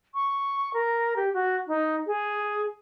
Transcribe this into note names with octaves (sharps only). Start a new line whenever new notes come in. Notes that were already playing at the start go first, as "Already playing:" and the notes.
C#6
A#4
G4
F#4
D#4
G#4